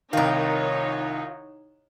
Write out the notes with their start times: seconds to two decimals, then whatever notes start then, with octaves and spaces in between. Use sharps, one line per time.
0.13 C2 D#3 D#4 F4 A#4 C#5